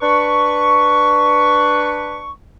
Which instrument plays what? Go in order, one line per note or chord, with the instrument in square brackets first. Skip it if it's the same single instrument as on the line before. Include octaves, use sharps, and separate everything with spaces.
[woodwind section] D4 B4 C#6